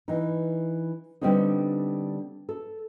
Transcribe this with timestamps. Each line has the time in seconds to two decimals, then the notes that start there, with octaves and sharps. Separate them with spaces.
0.08 E3 D#4
1.21 D3 G3 B3 C4 D4 D#4
2.49 A4